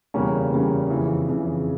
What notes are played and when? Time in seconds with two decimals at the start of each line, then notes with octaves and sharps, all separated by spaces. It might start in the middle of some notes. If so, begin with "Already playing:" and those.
0.14 E2 C#3 G3 A#3 C#4
0.52 E2 C#3 G3 A#3 C#4
0.90 F2 C#3 E3
1.28 F2 C#3 E3